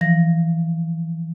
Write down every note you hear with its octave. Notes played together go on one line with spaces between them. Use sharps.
E3 F3 A#6